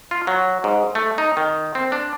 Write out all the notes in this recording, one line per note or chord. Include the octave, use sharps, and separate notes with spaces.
F4
F#3
G#2
A3
D#4
D#3
C4
D4